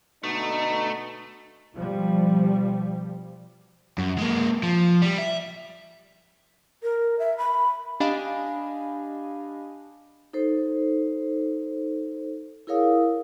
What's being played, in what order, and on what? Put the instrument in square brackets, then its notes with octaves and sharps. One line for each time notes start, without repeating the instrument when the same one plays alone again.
[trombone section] B2 D3 D#4 [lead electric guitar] A3
[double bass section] B2 F3 G3
[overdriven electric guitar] F#2
G#3 A#3
F3
G3
E5
[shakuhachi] A#4
E5
B5
[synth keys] D4 G4 D#5 F5 G#5 B5
[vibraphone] D#4 A4 C5
E4 G#4 A#4 C#5 F5 D#6